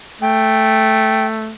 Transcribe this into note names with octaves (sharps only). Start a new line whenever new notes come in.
A3 G5